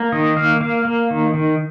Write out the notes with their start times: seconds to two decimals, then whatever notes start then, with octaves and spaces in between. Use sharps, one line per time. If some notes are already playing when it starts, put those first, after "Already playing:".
Already playing: A#3
0.12 D#3 D#5
0.36 A#3 F5
0.61 A#3 F5
0.85 A#3
1.10 D#3
1.34 D#3